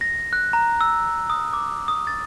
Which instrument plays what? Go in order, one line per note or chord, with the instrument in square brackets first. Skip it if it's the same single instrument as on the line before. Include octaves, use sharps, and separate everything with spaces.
[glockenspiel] A#6
F#6
A#5
E6
D#6
D6
D#6
A6